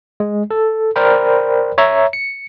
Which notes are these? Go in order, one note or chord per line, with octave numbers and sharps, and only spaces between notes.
G#3
A4
A#4 C5 D5 G5 B5
C#5 E5 A#5
C#7